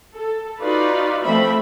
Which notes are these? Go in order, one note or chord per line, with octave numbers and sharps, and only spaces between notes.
A4
D#4 F4 F#4 B4 D5
F3 A3 C4 E5 B5